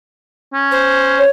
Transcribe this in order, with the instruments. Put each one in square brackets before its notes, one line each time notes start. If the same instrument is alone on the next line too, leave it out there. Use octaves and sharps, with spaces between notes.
[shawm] C#4
[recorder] C5
[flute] C#5